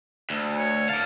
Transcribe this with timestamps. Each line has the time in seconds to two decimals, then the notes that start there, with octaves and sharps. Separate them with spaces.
0.30 D2
0.57 C#5
0.89 D5 F5 A5